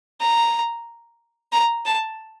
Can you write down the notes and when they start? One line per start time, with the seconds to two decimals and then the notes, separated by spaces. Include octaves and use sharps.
0.21 A#5
1.52 A#5
1.86 A5